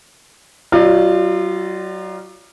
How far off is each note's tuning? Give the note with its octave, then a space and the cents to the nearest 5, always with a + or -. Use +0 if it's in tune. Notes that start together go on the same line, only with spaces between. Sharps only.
F#3 +30 F4 -15 D5 +40